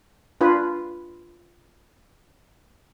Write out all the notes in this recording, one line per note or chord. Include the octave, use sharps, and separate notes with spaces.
D4 F4 B4